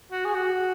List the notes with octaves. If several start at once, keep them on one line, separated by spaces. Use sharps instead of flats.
F#4
G#4
F#4